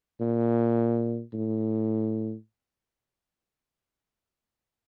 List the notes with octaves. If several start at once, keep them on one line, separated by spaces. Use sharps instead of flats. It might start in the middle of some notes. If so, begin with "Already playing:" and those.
A#2
A2